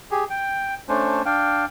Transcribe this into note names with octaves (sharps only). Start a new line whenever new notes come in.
G4 G#4
G5
A3 C#4 D4 C5
D4 F5 G5